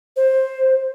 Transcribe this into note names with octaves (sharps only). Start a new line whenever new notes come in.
C5